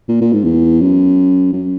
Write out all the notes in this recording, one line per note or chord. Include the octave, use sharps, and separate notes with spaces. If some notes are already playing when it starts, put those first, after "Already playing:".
A#2
A#2
G#2
E2
F#2
F#2